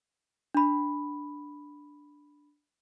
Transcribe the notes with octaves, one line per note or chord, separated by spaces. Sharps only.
D4 B5